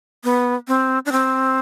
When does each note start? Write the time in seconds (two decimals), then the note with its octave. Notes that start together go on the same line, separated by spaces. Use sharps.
0.24 B3
0.68 C4
1.06 D4
1.12 C4